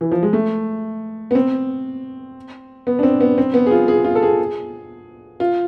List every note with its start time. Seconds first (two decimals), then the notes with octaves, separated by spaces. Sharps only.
0.01 E3
0.12 F3
0.23 G#3
0.33 A3
1.31 B3
1.35 C4
2.87 B3
2.99 D4
3.03 C4
3.21 B3
3.38 C4
3.54 B3
3.66 G#4
3.71 F4
3.88 G#4
4.04 F4
4.15 A4
4.23 G#4
5.40 F4